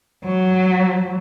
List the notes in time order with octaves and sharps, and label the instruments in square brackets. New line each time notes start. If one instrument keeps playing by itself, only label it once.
[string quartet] F#3